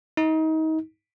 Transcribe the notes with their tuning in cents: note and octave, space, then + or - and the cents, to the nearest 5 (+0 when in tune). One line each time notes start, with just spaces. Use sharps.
D#4 +30